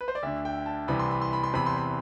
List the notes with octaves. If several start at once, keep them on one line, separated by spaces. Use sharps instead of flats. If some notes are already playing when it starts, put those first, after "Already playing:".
B4
C5
D5
D2 D3 E5
G5
A5
C2 C3 E3 B5
C6
B5
C6
B5
C6
E2 C3 E3 B5
C6
B5